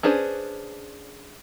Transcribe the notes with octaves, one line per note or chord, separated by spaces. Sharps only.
C#4 D4 G#4 B4 C5